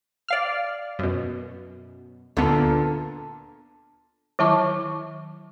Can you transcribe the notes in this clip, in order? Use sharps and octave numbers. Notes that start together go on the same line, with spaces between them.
D5 F5 F6
F#2 B2
D2 A#2 D3 B3
D#3 F#3 E4 A5 C#6 D6